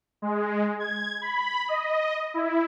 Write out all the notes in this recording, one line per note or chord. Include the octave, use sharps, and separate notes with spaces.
G#3
G#6
B5
D#5
E4